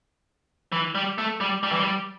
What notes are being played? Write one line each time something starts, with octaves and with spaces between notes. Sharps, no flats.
E3
G3
A3
G3
G3
E3
G3